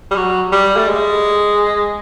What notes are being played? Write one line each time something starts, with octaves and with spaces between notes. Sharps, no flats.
G3
F#3
G3
A3
G#3